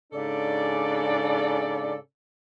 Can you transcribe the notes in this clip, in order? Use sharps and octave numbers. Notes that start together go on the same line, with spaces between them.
G#2 C#3 D4 A4 D5